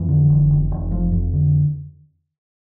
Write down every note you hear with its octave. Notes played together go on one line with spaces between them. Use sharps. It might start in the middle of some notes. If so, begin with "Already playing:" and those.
Already playing: F2 E3
D3
F1
F1
F1
F2
F2
D3